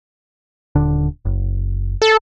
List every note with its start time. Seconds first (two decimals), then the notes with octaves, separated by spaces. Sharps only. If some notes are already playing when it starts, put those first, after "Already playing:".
0.75 D#1 D3 D4
1.25 F#1
2.02 A4